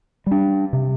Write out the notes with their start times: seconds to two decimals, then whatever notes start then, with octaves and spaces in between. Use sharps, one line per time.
0.26 G3 D4
0.73 C3